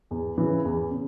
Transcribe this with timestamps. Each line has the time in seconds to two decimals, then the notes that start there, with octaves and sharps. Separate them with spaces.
0.11 E2
0.37 C#3 E3
0.65 E2
0.91 C#3